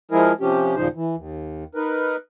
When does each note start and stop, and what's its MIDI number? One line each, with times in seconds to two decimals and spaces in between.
0.11 0.33 53
0.11 0.33 56
0.11 0.33 64
0.11 0.33 68
0.11 0.33 70
0.40 0.75 48
0.40 0.75 53
0.40 0.75 61
0.40 0.75 67
0.76 0.88 39
0.76 0.88 46
0.76 0.88 49
0.76 0.88 53
0.76 0.88 63
0.76 0.88 72
0.95 1.15 52
1.15 1.64 39
1.75 2.17 63
1.75 2.17 70
1.75 2.17 71